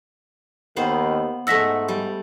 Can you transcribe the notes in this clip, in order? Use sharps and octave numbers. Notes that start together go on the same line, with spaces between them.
D#2 D#3 B3 C5
G#2 A3 E5 F#5 E6 A#6 B6
G3